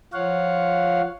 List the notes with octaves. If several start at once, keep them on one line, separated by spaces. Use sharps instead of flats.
F3 F4 C#5 F5 F#5